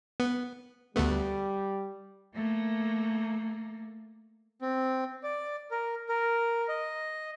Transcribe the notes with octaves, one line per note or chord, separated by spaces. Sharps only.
B3
D2 G3 A3 B3
A3 A#3
C4
D5
A#4
A#4
D#5